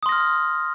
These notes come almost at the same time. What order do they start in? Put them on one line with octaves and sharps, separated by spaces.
D#6 C6 A#6 F6